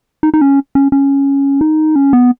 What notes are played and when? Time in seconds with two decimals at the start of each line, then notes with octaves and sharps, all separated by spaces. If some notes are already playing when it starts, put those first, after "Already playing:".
0.23 D#4
0.34 D#4
0.41 C#4
0.75 C#4
0.92 C#4
1.61 D#4
1.96 C#4
2.13 B3